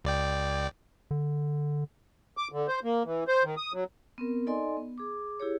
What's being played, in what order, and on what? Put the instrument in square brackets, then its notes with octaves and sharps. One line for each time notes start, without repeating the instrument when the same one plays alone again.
[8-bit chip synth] C#2 D5 G5
[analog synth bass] D3
[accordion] D6
D3
C5
A#3
E3
C5
D#3
D#6
F#3
[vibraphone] B3 C4 A#4
D#4 A4 D5 D#5 G#5 C6
B3
G#4 D6
E4 G4 G#4 C#5